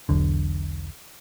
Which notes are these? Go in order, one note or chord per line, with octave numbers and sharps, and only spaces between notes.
E1 B1 D3